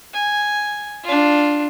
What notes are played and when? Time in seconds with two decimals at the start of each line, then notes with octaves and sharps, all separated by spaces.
0.14 G#5
1.04 D4 F4